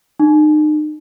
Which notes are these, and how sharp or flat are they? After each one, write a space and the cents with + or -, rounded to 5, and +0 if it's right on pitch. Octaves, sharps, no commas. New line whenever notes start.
D#4 -35